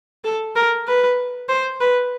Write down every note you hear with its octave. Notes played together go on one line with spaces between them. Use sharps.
A4
A#4
B4
C5
B4